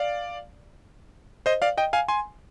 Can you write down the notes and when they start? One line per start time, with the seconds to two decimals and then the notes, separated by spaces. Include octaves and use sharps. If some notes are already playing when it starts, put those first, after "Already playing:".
Already playing: D5 F5
1.46 C5 D#5
1.62 D5 F5
1.78 D#5 G5
1.93 F5 G#5
2.08 G#5 C6